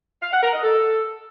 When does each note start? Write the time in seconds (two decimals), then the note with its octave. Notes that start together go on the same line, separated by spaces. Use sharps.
0.22 F5
0.32 F#5
0.43 A#4
0.53 D#5
0.63 A4